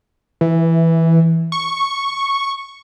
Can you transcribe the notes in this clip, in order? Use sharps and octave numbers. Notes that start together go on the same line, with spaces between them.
E3
C#6